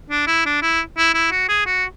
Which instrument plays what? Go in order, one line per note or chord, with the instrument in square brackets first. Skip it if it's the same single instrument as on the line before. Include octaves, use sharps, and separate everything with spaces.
[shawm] D4
E4
D4
E4
E4
E4
F#4
G#4
F#4